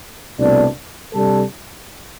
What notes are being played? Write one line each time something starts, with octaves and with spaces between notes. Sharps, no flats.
C2 B2 A3 D4
C3 G3 D4 A4